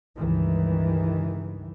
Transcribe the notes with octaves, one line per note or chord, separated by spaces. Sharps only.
C#2 G2 D#3 E3